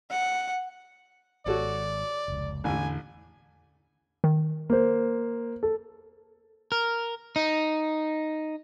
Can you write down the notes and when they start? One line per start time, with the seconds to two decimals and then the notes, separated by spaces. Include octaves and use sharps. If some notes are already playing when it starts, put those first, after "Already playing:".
0.11 F#5
1.46 G#1 F#4 A4 C#5 D5
2.28 F1 C#2
2.64 A1 E2 A2 D3 D4 G#5
4.24 D#3
4.70 A#3 C5
5.63 A4
6.72 A#4
7.36 D#4